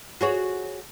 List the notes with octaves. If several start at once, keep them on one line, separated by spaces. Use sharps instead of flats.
F#4 G#4 C#5